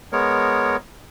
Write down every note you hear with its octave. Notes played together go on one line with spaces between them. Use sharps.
G#3 B3 A#4 C#5